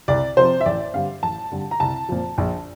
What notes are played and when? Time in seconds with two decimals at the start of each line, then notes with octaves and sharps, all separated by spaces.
0.08 C2 D5
0.37 C3 F3 C5
0.61 E5
0.66 A1 D5
0.94 G2 D3 G3 F5
1.23 A1 A5
1.51 G2 D3 G3
1.71 A#5
1.80 C2 A5
2.09 A#2 F3
2.38 A#1